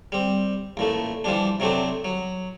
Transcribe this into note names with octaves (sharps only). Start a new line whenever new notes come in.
G3 C4
A1 A#2 A3
E3 F3 G3 D4
C3 F#3 A3 C4 D4
F#3